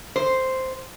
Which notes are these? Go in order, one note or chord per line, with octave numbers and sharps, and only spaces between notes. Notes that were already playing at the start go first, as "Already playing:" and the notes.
C5